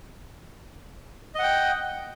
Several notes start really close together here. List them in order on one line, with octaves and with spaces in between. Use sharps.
D#5 F#5 G5